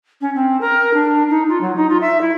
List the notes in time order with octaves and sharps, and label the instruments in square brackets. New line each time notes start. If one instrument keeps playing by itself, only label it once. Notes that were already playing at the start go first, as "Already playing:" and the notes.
[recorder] C#4
C4
A#4
D4
D#4
F4
F#3
D#4
F4
E5
E4